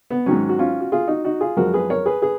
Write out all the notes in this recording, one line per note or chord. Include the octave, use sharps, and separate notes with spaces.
B3
G#2 D#3 F#3 C#4
F#4
C#4 F4
F#4
F4 G#4
D#4 F#4
D#4 F#4
F4 G#4
F#2 F3 G#3 F#4 A#4
G#4 B4
A#4 C#5
G#4 B4
G#4 B4